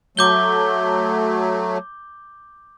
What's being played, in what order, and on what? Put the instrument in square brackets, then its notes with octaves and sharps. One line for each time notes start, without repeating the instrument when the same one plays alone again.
[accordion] F#3 A3 [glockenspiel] D6 G6 G7